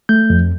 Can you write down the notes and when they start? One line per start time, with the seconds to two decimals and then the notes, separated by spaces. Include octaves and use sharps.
0.09 A3 G6
0.30 F2